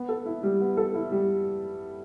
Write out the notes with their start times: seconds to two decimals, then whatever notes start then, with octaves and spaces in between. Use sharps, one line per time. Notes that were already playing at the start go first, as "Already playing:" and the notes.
Already playing: B3
0.09 A4
0.26 E4
0.43 G3
0.61 B3
0.77 A4
0.94 E4
1.12 G3